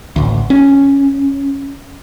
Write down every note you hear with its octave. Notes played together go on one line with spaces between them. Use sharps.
A1 D2
C#4